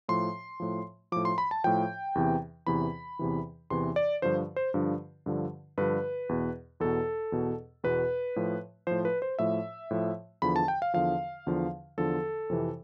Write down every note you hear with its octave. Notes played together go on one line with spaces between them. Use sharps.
A2 F3 C6
A2 F3
A2 F3 D6
C6
B5
A5
A2 F3 G5
E2 C3 E3
E2 C3 E3 B5
E2 C3 E3
E2 C3 E3 C6
D5
G2 D3 F3 C5
C5
G2 D3 F3
G2 D3 F3
G2 D3 F3 B4
E2 B2
E2 B2 A4
E2 B2
E2 B2 B4
A2 F3
A2 F3 C5
B4
C5
A2 F3 E5
A2 F3
E2 D3 F3 B5
A5
G5
F5
E2 D3 F3 F5
E2 D3 F3
E2 D3 F3 A4
F2 C3 E3